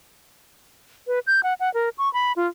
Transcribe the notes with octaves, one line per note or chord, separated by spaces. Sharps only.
B4
G6
F#5
F#5
A#4
C#6
B5
F4